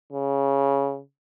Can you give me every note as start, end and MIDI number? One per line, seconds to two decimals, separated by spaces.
0.13 1.00 49